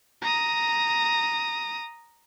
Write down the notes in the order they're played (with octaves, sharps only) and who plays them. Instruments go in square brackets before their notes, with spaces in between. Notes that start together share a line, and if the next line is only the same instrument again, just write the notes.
[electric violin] A#5 D#6